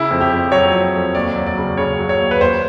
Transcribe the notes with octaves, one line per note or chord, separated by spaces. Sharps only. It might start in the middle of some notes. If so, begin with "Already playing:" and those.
Already playing: C#3 E4
F2
G4
F2
F#3 C#5
F2
F2
D#2 D5
F#3
D5
C#3
C#3 C#5
F#3
C#5
D#2
B4
D#2 C5